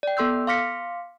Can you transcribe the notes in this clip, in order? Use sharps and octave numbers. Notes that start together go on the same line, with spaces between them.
D5 G5
B3 A4 C6 E6 G6
F5 C6 D6 F6 B6 C#7